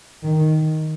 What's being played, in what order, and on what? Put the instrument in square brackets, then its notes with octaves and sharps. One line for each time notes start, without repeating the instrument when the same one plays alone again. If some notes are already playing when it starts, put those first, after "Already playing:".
[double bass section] D#3